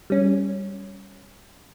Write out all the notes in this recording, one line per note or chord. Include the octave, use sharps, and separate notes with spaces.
G3 C#4